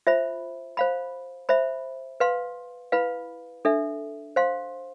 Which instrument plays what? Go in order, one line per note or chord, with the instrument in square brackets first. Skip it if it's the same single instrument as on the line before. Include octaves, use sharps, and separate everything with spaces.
[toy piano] F4 C5 E5 B5
C5 F5 B5
C5 E5 B5
B4 F5 C6
E4 B4 F5 B5
D4 A4 E5
C5 F5 C6